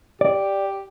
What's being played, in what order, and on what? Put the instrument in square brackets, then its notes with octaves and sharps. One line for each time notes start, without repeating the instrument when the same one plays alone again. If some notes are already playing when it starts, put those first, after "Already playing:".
[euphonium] G4 [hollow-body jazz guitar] D5